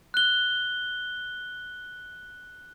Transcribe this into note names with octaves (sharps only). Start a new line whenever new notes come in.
F#6 G7